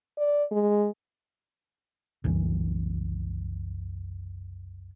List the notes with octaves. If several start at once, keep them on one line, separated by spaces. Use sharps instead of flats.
D5
G#3
F#1 C2 F#2 E3